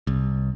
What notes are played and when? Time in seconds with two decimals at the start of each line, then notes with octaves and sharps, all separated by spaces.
0.07 C2